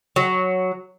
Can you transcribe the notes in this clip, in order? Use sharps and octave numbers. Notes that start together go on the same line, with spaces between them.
F#3